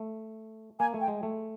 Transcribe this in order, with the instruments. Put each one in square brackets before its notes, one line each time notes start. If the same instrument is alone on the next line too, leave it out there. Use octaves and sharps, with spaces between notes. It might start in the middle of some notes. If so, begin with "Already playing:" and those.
Already playing: [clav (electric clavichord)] A3
[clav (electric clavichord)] A#3 [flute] G#5
[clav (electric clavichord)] A3
[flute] G5
[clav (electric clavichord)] G#3
A3